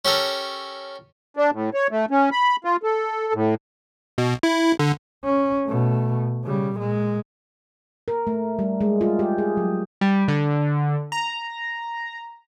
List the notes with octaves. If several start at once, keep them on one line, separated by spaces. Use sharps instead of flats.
C#4 G4 A4 A#4
D4
A2
C#5
A3
C#4
B5
F4
A4
A2
B2
E4
D3
C#4
B2 A3
C#3 G3
A#2 G#3
A#4
A3
G3
G#3
F4
G4
G#4
F#3
G3
D3
A#5